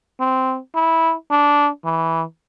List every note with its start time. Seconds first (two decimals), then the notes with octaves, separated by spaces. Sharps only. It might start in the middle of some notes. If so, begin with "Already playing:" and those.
0.20 C4
0.75 E4
1.31 D4
1.85 E3